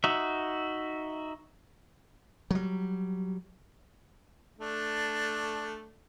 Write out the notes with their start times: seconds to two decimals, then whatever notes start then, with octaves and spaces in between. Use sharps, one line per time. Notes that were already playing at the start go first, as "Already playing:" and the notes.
0.04 D#4 F#4 E5
2.51 F#3 G3
4.59 A3 D4